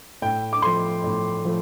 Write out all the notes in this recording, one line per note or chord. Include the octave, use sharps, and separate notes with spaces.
A2 G5
D6
F3 A3 C6
A2
F3 A3